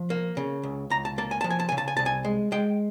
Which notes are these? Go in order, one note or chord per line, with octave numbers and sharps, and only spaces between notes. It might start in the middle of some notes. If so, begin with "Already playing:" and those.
Already playing: F3
A#3
C#3
C#2
C#2 A#5
A5
A#3 A5
G#5
F3 A5
G#5
A5
C#3 G#5
A5
G#5
C2 A5
G#5
G#3
G#3 G5